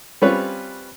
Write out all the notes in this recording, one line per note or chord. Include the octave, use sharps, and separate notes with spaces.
G3 C4 C#4 F4 B4 C#5